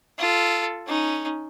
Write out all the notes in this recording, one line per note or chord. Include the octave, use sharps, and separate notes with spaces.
F4 A4
C#4 D#4